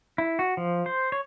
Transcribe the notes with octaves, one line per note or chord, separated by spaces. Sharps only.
E4
F#4
F3
C5
C#5